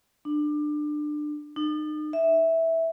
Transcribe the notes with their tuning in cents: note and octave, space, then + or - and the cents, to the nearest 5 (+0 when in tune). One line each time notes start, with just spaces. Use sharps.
D4 +25
D#4 -40
E5 -10